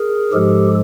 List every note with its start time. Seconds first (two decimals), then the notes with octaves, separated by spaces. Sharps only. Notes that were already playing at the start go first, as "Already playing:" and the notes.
Already playing: G#4 A#4
0.32 G#2 F3 G#3 G4 A4